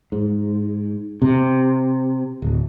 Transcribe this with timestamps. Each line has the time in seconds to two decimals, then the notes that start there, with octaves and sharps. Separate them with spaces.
0.12 G#2
1.22 C3
2.42 D1